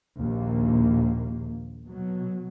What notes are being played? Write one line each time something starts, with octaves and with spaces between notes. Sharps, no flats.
A#1 D#2 A#3
B2 F#3